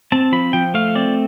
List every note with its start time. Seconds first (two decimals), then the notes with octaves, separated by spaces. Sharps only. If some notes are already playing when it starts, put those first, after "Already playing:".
0.12 C4 A5
0.32 F3 B5
0.53 F3 G5
0.74 A3 F5
0.95 C4 D5